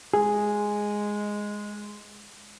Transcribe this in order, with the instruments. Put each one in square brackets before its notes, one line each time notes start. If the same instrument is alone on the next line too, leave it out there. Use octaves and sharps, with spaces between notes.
[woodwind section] G#3 [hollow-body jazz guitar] G#4